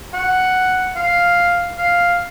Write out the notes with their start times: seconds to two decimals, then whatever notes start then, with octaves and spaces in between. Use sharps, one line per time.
0.14 F#5
0.96 F5
1.77 F5